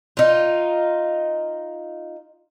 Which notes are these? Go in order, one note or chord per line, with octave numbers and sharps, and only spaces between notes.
D#4 F4